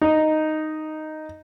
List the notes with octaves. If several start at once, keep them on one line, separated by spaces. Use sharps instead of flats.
D#4